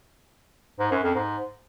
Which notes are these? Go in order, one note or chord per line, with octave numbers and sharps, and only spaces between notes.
G#2
F#2
F2
G#2